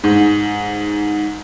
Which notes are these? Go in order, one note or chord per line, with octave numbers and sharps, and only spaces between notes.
G#2